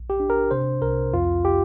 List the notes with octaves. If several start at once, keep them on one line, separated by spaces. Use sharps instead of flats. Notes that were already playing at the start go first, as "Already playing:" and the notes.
Already playing: A#1
G4
D4
A#4
C3 C5
C2 A#4
F2 F4
G4